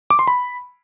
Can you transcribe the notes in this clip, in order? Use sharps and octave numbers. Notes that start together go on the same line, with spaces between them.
D6
C6
B5